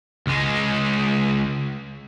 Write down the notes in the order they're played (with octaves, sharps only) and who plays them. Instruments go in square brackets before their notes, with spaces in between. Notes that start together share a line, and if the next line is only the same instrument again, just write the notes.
[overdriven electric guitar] C#2 G#3